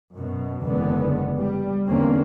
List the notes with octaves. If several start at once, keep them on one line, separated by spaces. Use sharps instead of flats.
F#2 B2
F#1 E2 D3 G#3 B3
G3
E2 D3 A#3 C4 C#4